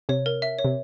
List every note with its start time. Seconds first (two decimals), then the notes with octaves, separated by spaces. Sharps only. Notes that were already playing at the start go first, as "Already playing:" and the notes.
0.09 C3 C#5
0.26 A#4
0.42 E5
0.59 C#5
0.65 C3